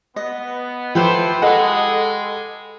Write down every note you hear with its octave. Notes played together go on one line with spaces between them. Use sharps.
B3 D#5
F3 E4 G4 A4 B4 C5 G5
G#3 A4 D#5 F#5